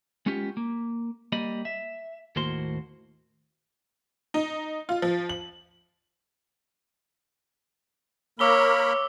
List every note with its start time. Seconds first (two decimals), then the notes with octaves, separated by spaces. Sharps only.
0.26 G#3 B3 C#4 F4 G4
0.57 A#3
1.32 G3 A#3 D#5 B5
1.65 E5
2.36 D#2 A2 A#3 F#4 C5 C6
4.34 D#4
4.89 F4
5.02 F3
5.29 F#7
8.39 A#3 A#4 C#5 B5 D6 E6 G7